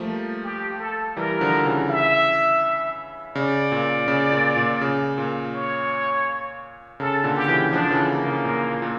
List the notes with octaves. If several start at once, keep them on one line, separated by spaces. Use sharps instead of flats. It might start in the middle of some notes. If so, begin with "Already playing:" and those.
Already playing: F3 G3 A3 A#3
G4
A4
E3 G3 A#4
D3 F3
C#3 E3
E5
C#3 D5
A#2
C#3
A#2
A#2
C#3
A#2
C#5
C#3 A4
A#2 D3
G4
C#3 E3
D3 F3 D4
C#3 E3
A#3
C#3
A#2
A#2